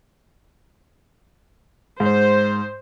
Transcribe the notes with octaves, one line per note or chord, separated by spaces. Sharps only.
G#2 C5